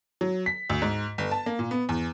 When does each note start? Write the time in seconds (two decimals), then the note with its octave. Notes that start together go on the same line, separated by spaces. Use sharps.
0.21 F#3
0.46 B6
0.70 D2
0.82 G#2
1.18 G1
1.31 A5
1.46 A#3
1.59 A#2
1.71 B3
1.89 E2